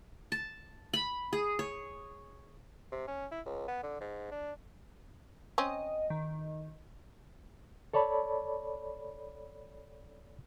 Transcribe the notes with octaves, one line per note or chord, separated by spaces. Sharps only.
A5
B5
G#4
C#5
C3
C#4
E4
C#2
B3
D3
G#2
D4
C4 C#4 D#5
D#3
A4 C#5 D5 A5 B5